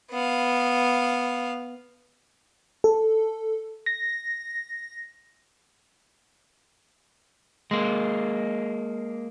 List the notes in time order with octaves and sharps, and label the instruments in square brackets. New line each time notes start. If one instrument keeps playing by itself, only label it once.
[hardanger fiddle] B3 F5
[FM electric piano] A4
A#6
[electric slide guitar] G#3 A#3